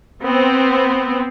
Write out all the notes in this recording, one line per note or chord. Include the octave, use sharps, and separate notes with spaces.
B3 C4